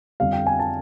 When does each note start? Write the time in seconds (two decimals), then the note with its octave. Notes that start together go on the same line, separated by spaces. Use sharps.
0.20 F2 D3 G3 F5
0.33 G5
0.47 G#5
0.59 A5